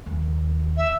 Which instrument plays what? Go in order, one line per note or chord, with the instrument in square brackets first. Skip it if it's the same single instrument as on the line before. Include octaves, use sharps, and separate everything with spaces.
[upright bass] D#2
[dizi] E5